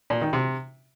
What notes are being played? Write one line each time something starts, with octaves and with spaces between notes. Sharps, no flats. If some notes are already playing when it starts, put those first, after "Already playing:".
A#2
D#3
C3